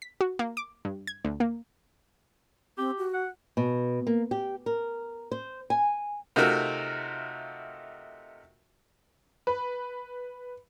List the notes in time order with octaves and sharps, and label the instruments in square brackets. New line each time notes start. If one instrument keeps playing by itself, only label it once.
[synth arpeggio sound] B6
F#4
A#3
D6
G2
G#6
D2
A#3
[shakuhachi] C4 [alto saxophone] G4
[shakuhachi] F#4
[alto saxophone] F#5
[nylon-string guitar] B2
A#3
G4
A#4
C5
G#5
[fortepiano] C3 A3 D#4 F4 F#4 A#4
[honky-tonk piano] B4